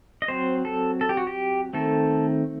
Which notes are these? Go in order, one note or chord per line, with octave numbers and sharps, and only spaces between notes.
D#5
F#3 C4 C5
A4
A4
G4
F#4
G4
D#3 A3 C4 A4